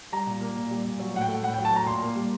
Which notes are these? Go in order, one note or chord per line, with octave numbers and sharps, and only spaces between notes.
G3 A#5
A#2
A#3
A#2
G3
A#2
F#3
A2 F#5
G5
A3
A2 F#5
G5
F#3
A5
A2 A#5
A#2 C6
A#3
G3